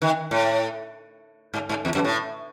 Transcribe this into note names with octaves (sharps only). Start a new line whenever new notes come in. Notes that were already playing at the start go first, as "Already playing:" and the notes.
D#3
A2
G#2
G#2
E2
F#2
A2